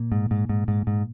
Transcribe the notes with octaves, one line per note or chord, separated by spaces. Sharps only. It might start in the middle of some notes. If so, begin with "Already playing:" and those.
Already playing: A#2 A#3
G#2
G#2
G#2
G#2
G#2